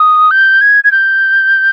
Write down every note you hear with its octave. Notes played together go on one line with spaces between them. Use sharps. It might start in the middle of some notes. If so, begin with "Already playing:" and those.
Already playing: D#6
G6
G#6
G#6
G6